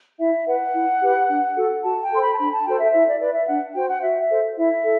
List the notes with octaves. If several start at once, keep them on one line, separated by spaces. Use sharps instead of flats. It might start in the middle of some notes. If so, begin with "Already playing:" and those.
E4 E5
B4 F#5
E4
G4 B4
D4
F#4 A4
F#4 A5
G5
A4 C5 C6
B5
A5
D4 B5
A5
F#4 A4 C5 G5
E5
E4 E5
D5
B4 D5
E5
D4 F#5
F#4 C5 G5
F#5
F#4 E5
E5
A4 C5
E4 E5
A4